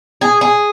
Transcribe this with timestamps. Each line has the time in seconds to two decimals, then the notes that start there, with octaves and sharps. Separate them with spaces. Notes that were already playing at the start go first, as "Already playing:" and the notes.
0.21 G#4
0.41 G#4